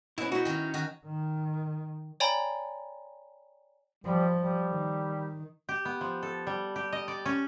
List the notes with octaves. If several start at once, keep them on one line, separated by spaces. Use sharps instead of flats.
B2 C#4 E4
D#4 E4 F#4
D#3 C#4
D#3 F#4
D#3
C#5 D5 G5 G#5 A#5 B5
F3 G3
G3
D#3
G4
B3
F3
A4
G3
G4
D#5
D5
C#4